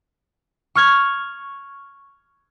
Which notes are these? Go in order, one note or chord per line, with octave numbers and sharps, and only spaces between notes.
C#6 F6 G#6